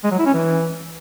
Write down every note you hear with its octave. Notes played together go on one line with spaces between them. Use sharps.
G#3
F#3
E4
C#4
E3